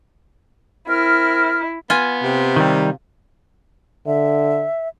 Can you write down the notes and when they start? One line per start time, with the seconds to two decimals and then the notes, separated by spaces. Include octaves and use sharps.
0.88 C4 E4 A#4 F6
1.90 B3 F4 G#5
2.23 C3
2.56 D#3 G3
4.07 D3 E5